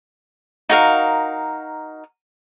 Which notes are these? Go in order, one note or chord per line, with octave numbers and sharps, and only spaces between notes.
D#4 F#4 A#4 F5